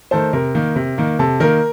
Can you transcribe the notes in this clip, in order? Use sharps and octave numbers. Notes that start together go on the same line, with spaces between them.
D#3 A3 A4 C5
C3 A#4
D#3 A#3
C3
D#3 A#3
C3 A4
D#3 A#3 A#4